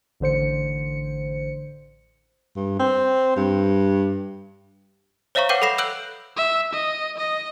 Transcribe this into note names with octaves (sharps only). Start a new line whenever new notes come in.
A1 D3 C5 C#7
G2
C4
G2
C5 C#5 E5 F5 A#5 C#6
B4 F#5 G5 D6 G6 D#7
A4 B5 A#6 C7 E7
E6 F#6 G6 D7 F#7
E5
D#5
D#5